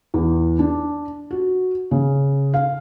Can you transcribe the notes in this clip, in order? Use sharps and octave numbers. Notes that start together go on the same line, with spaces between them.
E2
D4
F#4
C#3
F5